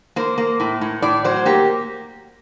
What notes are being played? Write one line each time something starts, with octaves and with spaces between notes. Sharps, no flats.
A#3 C5
A#3
A2
A2
A2 D5
F#3 C5
A#3 G4